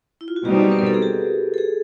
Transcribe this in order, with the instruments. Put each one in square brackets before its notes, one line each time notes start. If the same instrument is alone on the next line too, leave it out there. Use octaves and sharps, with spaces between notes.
[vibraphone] E4
F4
F#4
[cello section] B2 G3 C4 D#4 [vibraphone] G4
[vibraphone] B4
A#4
A4
G#4
G4
A4
G#4